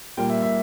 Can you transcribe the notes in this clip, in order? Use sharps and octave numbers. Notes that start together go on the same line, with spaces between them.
A#2 G3 A#3 G5
E5
E5